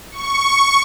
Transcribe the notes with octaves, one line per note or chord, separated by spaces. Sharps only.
C#6